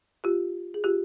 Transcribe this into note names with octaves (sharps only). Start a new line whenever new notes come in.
F4 G4
G#4
F4 G4